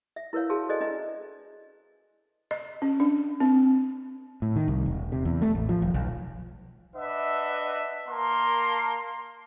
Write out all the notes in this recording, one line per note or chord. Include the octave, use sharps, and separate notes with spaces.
E5
E4 A#4 B4 C#5 F5
F#4 G#4 F5 A5
A4 B4 C5 D5 D#5 G#5
C#4 D4 D#5 E5 G#5 A#5
D#5
C#4
D4
C4
A2
D#3
C2
E1
C3
E2
A3
A1
F3
D#1
B1
D4 B4 D#5 E5 F#5
A#3 A5 A#5 C6